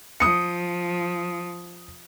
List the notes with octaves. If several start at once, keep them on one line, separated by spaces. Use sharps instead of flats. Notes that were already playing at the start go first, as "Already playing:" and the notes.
F3 D#6 C#7